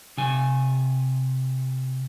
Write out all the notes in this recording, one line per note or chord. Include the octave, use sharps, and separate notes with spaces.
C3 G#5